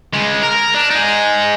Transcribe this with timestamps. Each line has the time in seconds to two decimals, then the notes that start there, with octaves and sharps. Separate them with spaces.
0.14 C#3 G#3
0.43 A#4
0.75 D4
0.91 D#4 G#4